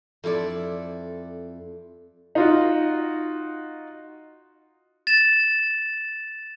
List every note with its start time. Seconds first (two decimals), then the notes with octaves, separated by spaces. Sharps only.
0.24 F2 E4 A4 D5
2.35 D#4 F4 F#4
5.07 A6 E7